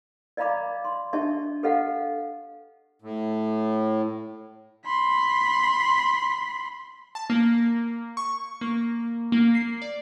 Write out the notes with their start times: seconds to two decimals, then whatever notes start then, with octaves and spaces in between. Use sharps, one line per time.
0.37 D5 D#5 F5 A#5 B5 D6
0.85 C6
1.13 D4 G4 D#5 E5 A5 C#6
1.63 G4 A4 B4 D#5 F5 F#5
3.02 A2
4.85 B5 C6
7.15 A5
7.30 A#3
8.17 C#6
8.61 A#3
9.32 A#3
9.55 C7
9.82 D5